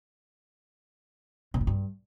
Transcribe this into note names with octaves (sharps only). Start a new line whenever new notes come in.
B2
G#2
G2